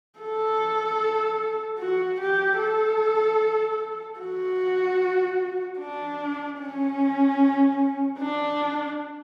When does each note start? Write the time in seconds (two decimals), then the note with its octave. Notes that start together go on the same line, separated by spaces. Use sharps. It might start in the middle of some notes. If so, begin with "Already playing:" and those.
0.19 A4
1.79 F#4
2.20 G4
2.59 A4
4.19 F#4
5.78 D4
6.59 C#4
8.18 D4